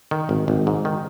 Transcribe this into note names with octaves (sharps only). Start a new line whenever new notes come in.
D#3
G#1
G#1
G#2
D#3